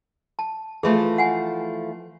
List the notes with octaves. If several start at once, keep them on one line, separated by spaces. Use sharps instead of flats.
A5
E3 F3 A3 G#4 E5
F#5 G#5